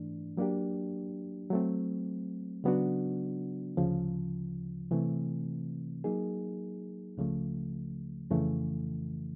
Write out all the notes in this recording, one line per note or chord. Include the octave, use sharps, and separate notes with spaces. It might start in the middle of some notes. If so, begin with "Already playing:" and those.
Already playing: G#2 E3 A3 D4
F#3 A#3 D4 G4
F#3 A3 C4
C#3 F#3 B3 D4 F#4
D2 C#3 F3
C3 E3 A3 C4
F#3 A#3 D#4 G#4
C#2 C#3 F3 A3
F2 C#3 E3 A3